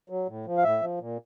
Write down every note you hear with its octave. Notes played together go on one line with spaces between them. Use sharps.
F#3
A2
F3
F5
A2 E5
F3
A#2